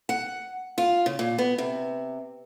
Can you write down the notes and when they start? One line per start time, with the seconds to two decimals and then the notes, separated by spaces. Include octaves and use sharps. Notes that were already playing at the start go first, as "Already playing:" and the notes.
0.09 F#5
0.78 F4
1.06 C#3
1.19 A#2
1.38 B3
1.58 C3